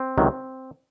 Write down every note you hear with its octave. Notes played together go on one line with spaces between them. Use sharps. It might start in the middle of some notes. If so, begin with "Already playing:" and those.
Already playing: C4
C#2 C3 D#3 F#3